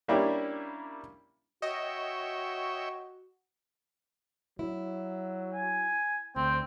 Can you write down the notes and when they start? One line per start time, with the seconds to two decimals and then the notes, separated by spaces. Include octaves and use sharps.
0.08 G3 A#3 C#4 D4 E4 G4
1.62 F#4 C#5 D#5 E5 G5
4.59 F#3 E4
5.53 G#5
6.36 D2 C4 G5